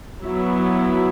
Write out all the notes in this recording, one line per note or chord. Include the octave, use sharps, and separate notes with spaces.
F#3 B3 E4